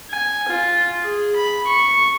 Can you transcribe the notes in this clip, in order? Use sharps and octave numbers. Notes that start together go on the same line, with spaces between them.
G#5
F4
G#4
B5
C#6